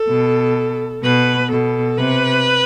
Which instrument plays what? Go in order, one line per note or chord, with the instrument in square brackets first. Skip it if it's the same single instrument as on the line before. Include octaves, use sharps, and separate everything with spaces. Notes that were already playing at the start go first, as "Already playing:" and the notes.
Already playing: [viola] A4
[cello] B2
[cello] B2 [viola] B4
[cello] B2 [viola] A4
[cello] C3 [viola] B4